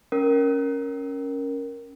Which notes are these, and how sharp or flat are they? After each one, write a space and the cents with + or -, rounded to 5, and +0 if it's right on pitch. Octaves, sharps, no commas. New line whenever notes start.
C#4 +0 A#4 +0